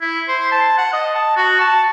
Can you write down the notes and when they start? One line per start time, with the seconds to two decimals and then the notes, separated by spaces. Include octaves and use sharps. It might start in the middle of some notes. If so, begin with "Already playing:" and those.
0.01 E4
0.28 C5
0.52 A5
0.78 F#5
0.93 D#5
1.15 A5
1.36 F#4
1.61 A5